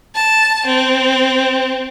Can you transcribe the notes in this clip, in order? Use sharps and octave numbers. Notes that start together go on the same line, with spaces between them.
A5
C4